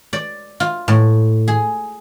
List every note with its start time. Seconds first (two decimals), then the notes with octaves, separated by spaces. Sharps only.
0.13 D5
0.60 F4
0.88 A2
1.48 G#4